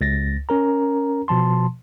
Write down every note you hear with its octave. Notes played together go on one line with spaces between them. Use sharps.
C#2 A6 A#6
C#4 A#4 A#5
B2 F3 A5 C6